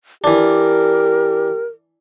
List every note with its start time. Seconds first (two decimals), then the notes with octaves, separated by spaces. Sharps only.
0.24 E3 D4 G4 A#4